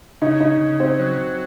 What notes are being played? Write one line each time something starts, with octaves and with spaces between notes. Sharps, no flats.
C#3 D#4
D#4
C#3
C4
F#3